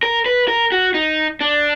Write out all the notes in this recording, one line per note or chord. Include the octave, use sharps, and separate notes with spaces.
A#4
B4
A#4
F#4
D#4
D4